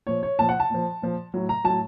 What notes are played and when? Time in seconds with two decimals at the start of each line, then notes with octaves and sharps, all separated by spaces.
0.07 A#2 F3 C#5
0.23 C#5
0.39 A#2 F3 A5
0.49 F#5
0.60 A5
0.70 A#2 F3
1.02 A#2 F3
1.34 A2 F#3
1.49 A#5
1.64 A2 F#3 A5